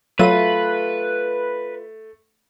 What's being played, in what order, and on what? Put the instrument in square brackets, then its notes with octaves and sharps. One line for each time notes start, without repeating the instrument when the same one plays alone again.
[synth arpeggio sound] F#3 E5 D#7 [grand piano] A3 [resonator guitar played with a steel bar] F4 [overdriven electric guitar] B4